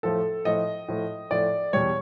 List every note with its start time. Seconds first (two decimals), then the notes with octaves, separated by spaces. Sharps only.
0.03 A2 F3 A3 A4
0.45 A2 F3 A3 D#5
0.88 A2 F3 A3
1.31 A2 F3 A3 D5
1.73 E2 B2 G3 C#5